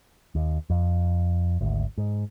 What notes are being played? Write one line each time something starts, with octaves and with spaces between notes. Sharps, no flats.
D#2
F2
G#1 D2
G#2